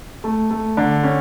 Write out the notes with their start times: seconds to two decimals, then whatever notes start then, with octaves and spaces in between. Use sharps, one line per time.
0.24 A3
0.51 A3
0.77 D3
1.04 C#4